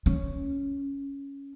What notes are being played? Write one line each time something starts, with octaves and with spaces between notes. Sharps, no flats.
C#4